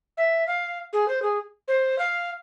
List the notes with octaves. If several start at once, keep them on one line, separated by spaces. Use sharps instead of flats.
E5
F5
G#4
C5
G#4
C5
F5